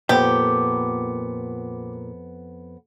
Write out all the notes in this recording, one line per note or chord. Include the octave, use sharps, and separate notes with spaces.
F2 A#2 B3 G4